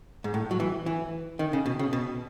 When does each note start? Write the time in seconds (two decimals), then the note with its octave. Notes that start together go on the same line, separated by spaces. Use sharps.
0.24 G#2
0.34 A2
0.51 F#3
0.60 E3
0.86 E3
1.39 D#3
1.53 C#3
1.66 B2
1.79 C#3
1.93 B2